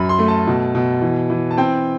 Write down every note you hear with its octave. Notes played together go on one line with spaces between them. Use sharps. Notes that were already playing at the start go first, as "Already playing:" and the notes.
Already playing: F#2 B5
C6
A3
A5
B2
B2
E3
E3
A5
C4 G5